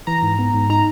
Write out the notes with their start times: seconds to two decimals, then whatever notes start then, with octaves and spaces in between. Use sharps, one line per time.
0.07 E3 A#5
0.23 G#2
0.39 B3
0.54 G#2
0.70 D#4 A#5